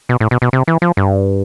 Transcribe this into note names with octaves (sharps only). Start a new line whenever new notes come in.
B2
A2
B2
B2
C3
E3
F3
G2